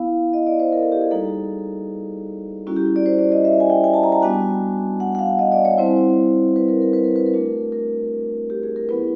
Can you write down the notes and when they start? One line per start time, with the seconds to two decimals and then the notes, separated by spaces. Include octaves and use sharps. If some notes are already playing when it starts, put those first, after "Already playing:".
Already playing: B3 E4 F5
0.33 D#5
0.47 D5
0.60 C5
0.72 A#4
0.82 A4
0.92 G4
1.01 G#4
1.11 G3 A#3 D#4 F#4 A4
2.67 G3 A#3 C#4 E4 F#4
2.76 G4
2.96 D5
3.06 C5
3.19 D5
3.32 D#5
3.45 E5
3.60 G#5
3.70 G5
3.84 G#5
3.94 A5
4.04 A#5
4.12 A5
4.22 G3 B3 D4 F#4 G#5
5.00 F#5
5.15 F#5
5.19 F5
5.39 D#5
5.52 D5
5.65 C#5
5.78 G3 C4 E4 C5
6.56 B4
6.69 A#4
6.82 A#4
6.93 B4
7.04 A#4
7.16 B4
7.26 A#4
7.34 A3 D4 F#4
7.72 A#4
8.50 G4
8.63 G#4
8.76 A#4
8.89 F#3 B3 E4 B4